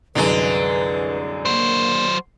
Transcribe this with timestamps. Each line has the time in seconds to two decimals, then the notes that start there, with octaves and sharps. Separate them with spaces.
0.15 C2 F#2 D3 G#3 B4
1.45 F#3 A#3 C5